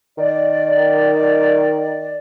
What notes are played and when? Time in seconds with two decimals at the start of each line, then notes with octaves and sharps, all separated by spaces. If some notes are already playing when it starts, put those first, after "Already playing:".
0.18 D#3 D5